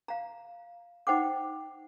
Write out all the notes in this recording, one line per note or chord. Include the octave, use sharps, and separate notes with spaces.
F5 A#5
D#4 C5 F#5 G5 D6